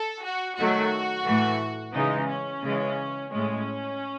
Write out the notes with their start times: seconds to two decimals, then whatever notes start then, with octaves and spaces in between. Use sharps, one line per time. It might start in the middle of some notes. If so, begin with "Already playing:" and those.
Already playing: A4
0.24 F#4
0.57 D#3 F#3 A3 F#4
1.26 A2 E3 A3
1.94 C#3 E3 G#3 D#4
2.29 C#4
2.63 C#3 E3 G#3
3.32 A2 G#3 C#4